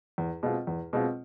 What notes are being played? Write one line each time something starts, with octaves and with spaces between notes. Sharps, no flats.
E2
B2 G#3 C4 F4
E2
B2 G#3 C4 F4